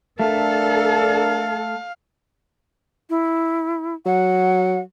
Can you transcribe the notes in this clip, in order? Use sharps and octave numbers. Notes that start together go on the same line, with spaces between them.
A3 D4 A4 A#4 F5
E4
F#3 F#5